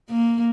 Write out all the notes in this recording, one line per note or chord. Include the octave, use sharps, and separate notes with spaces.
A#3